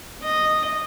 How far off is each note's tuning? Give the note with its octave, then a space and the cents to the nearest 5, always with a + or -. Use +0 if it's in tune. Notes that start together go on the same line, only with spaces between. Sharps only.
D#5 -5